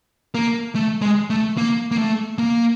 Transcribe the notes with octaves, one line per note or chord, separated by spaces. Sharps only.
A#3
A3
G#3
A3
A#3
A#3
A3
A#3